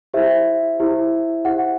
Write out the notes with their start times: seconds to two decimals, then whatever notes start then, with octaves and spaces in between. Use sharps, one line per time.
0.14 E4 G4 C5 E5
0.79 E4 G4 C5
1.45 E4 G4 C5 F#5